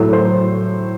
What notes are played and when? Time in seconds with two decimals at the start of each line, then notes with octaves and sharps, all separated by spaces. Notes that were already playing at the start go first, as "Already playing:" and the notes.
Already playing: A2 F#3 A3
0.13 C5